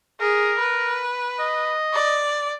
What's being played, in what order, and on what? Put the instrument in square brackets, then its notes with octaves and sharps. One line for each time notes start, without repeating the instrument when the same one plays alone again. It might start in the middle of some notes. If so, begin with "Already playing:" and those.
[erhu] G#4 [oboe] A#4
[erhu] B4
[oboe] D#5
[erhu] D5